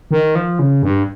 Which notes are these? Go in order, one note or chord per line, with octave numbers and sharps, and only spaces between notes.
D#3
F3
C#3
G2